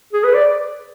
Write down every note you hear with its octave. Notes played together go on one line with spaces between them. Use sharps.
G#4
B4
D5